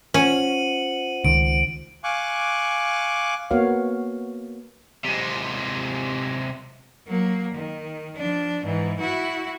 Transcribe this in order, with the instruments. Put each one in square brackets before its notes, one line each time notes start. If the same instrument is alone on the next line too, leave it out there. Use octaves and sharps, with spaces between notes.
[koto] C#4 [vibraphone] F4 C5 F#5 [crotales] C#7 D#7 F#7
[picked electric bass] C#2 D#3 [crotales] D7
[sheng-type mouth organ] F5 G#5 C#6 D6 F#6
[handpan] A#3 B3 F#4 C#5 F5
[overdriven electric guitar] C3 G#3
[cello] F#3 A#3
D#3
F3 D4
G#2 E3
E4 F#4